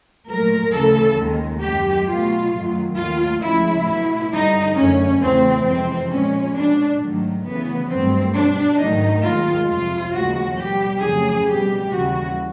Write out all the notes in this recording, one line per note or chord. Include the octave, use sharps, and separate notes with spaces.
A#2 F#3 A3 A#4
D2 C#3 E3 A3 A4
D#2 D#3 G#3
F#2 D#3 G#3 G4
B2 F#3 A3 F4
F#2 D#3 F#3 A3
D#2 D#3 F#3 A3 F4
D2 C#3 F3 G#3 E4
B2 F#3 A3 E4
G2 D3 G3 D#4
F#2 D3 F#3 A3 C#4
E2 C#3 E3 A3 C4
F2 C3 E3 G#3 C4
A#2 F3 G#3 C#4
B2 G#3 D4
G#2 D#3 F#3 A3
D2 C#3 E3 A3 B3
G2 D#3 F#3 A3 C4
B2 G3 D4
G#2 D#3 F#3 A3 D#4
D#2 D#3 G#3 F4
F2 C3 F3 F4
D#2 C#3 F3 G#3 F#4
B2 G3 G4
F2 C#3 F#3 A3 G#4
B2 G3 G4
D#2 C#3 E3 G3 F#4